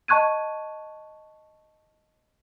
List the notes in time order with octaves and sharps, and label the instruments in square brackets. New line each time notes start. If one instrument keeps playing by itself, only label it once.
[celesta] D#5 A5 C#6 F#6 G#6 D#7